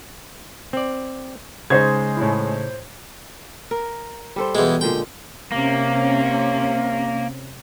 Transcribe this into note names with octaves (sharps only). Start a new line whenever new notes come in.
C4 D5
C#3 G#3 D#4 C5 G#6
A2 E4
A#4
G3 A4 C5
E2 B2 G#3
A#2 D3 G#3 G5
C3 A#3 C#4